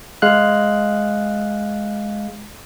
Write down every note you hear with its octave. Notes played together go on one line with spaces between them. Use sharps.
G#3 F5 F#6